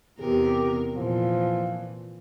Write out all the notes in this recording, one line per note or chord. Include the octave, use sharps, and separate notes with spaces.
E2 C3 G4 A#4
A#2 E3 F3